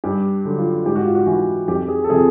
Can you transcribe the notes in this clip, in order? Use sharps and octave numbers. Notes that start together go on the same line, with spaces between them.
G2 G4
D3 F#3
F4
G#2 G4
F#4
F4
F#4
E3 F#4
F2 G4
G#4
A4
C3 F3 G#4